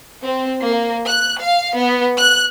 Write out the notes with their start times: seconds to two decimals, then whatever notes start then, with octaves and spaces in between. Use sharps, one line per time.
0.23 C4
0.63 A#3
1.06 F#6
1.41 F5
1.76 B3
2.18 F#6